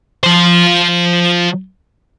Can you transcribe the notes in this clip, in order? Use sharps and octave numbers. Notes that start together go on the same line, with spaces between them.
F3 C5